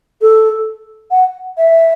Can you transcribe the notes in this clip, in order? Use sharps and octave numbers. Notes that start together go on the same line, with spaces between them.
A4
F#5
E5